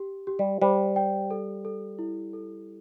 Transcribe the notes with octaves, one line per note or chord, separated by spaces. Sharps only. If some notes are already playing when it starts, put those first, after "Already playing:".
Already playing: G4
G4
G3
G3 C5
G5
A4
A4
E4
A4